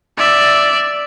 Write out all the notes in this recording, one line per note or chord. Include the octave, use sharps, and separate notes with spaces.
D5 E5